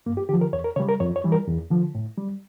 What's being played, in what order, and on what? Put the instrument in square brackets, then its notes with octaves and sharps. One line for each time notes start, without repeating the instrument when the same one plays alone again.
[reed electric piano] G2 A#3
G4
D3 F3 G4
A#4
E2 C#5
A#4
C#3 G3 C#5
A#4
F2 C#5
C#5
E3 G3
A#4
E2
D3 F3
A2
G3